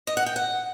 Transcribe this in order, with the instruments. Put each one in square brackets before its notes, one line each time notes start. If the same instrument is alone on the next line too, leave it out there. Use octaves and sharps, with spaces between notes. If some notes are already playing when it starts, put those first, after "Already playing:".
[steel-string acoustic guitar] D#5
F#5
G5
F#5